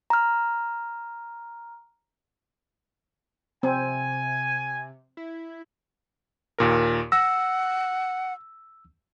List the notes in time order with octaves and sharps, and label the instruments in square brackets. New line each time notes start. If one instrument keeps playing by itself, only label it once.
[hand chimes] A#5 F6
[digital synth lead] C3 [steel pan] C4 [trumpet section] G#5
[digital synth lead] E4
[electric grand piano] D#2 A#2 A#4
[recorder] F#5 [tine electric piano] E6 [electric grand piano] A#6